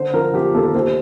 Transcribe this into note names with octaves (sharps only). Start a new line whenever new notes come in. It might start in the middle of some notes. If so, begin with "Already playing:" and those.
Already playing: D3 C5
F3 A#4
F3 G4
D#2 A4
D#2 C5